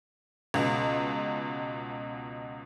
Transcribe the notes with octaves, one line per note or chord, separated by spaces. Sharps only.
C#2 B2